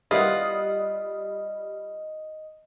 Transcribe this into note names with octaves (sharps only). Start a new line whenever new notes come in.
G3 A#3 B3 E4 F4 D#5 F#5 D#6